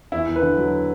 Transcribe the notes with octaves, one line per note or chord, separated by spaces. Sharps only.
E2 E4
E2
B4
D3
F#3